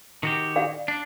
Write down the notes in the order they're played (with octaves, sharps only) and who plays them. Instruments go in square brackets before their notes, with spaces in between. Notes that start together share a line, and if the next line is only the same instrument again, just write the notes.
[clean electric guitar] D#3 F#4 G4
[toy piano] D5 F5
[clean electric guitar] D4